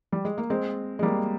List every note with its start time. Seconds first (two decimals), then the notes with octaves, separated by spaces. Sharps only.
0.12 G3
0.25 G#3
0.38 A#3
0.50 G#3 C4
0.99 G#3
1.03 G3 A#3